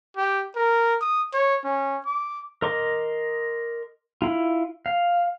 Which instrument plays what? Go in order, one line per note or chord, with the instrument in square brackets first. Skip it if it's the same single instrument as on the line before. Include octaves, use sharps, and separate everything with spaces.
[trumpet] G4
A#4
D#6
C#5
C#4
D6
[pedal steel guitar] A#4 D#5 C6 D6
E4 F4
F5